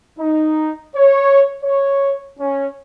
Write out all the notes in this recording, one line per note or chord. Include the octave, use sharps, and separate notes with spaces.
D#4
C#5
C#5
C#4